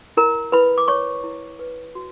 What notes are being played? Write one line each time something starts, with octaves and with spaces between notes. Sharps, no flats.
E4 A#4 A#5
E4 B4 B5
D6
C#5 C#6
E4
B4
F#4